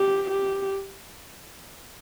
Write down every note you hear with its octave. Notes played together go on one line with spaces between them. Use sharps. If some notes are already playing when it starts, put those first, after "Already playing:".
Already playing: G4
G4